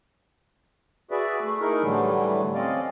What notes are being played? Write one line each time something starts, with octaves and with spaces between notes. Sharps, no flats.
F#4 G#4 B4 D5 E5
A3
D#4 E4 G#4 A#4
A2 D3 E3 F#3 G3 A3
C4 C#4 D5 D#5 F5